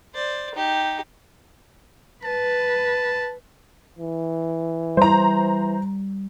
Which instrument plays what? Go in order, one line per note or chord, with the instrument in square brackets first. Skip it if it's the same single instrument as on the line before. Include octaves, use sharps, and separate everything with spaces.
[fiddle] C5 D5
D#4 G4
[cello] B4 [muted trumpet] A5
[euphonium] E3
[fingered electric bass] G3 [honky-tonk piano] C5 A#5